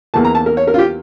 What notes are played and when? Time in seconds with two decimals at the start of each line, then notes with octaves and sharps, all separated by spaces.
0.14 E2 E3 A#3 A5
0.25 A#5
0.35 A5
0.46 A#4
0.57 C#5
0.67 A#4
0.74 F4
0.78 G4